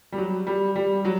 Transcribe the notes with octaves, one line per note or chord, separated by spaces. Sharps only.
G3
F#3
G3
G3
F#3